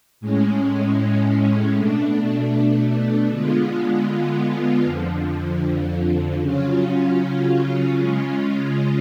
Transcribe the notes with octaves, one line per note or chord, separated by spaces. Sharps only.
A2 G#3 C#4
B2 A3 D4
D3 G#3 B3 F4
F2 D3 F3
C#3 F#3 C#4 F4
C#3 G#3 C#4 F4